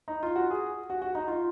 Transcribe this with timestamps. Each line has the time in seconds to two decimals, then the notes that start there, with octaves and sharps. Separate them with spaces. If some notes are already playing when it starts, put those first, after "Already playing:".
0.08 D#4
0.23 F4
0.36 F#4
0.50 G#4
0.90 F#4
1.02 F#4
1.15 D#4
1.28 F4